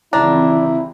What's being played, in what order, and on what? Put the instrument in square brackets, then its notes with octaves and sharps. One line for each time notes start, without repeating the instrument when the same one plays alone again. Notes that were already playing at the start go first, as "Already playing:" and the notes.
[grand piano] G#1 C#2 A#5 [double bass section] E3 C4 [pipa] D4 [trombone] E4